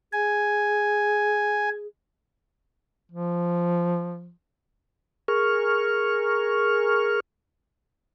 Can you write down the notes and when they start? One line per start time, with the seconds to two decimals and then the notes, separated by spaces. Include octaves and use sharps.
0.13 G#4 G#5
3.12 F3
5.28 G#4 A#4 C#6 F6